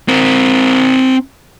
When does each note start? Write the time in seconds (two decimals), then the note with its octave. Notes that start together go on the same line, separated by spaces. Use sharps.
0.08 C4 A#4